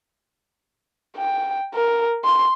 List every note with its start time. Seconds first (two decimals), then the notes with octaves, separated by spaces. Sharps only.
1.17 G5
1.75 A#4
2.24 C6